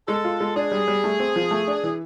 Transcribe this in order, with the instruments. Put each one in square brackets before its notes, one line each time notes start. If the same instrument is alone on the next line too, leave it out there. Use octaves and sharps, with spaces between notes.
[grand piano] G#3 [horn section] A4
[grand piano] F4
G#3
[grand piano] D4 [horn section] G#4
[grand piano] G3
G3
A3
C4
F3
A3
D4
E3